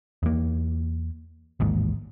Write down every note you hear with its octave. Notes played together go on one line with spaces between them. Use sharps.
E2 A#3
A1 D#2 G#2